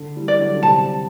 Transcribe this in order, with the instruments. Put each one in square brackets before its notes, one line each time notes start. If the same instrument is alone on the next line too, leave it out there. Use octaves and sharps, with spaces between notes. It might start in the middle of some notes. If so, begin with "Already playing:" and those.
Already playing: [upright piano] D3
E3 G3
[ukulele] D5
[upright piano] D3 F#3
D3
[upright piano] C3 [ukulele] A5